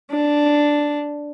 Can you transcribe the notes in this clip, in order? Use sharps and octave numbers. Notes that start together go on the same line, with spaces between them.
D4